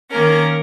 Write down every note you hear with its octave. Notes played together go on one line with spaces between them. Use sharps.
D#3 A#3 C#4 A#4